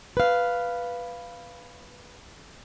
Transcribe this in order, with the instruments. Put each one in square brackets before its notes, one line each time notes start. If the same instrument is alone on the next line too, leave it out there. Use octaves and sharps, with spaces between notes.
[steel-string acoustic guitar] B4 F5